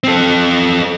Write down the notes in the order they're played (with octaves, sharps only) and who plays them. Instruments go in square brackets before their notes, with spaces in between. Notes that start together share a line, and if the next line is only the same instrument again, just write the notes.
[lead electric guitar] C4 A4